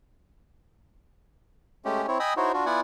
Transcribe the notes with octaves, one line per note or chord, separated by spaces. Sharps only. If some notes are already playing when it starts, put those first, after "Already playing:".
G#3 A3 C#4 G4
C4 E4 C#5
D#5 G5 G#5 B5 D#6 E6
D#4 E4 F#4 C5 C#5
D4 F4 F#4
B3 E4 F4 D5 F#5 G#5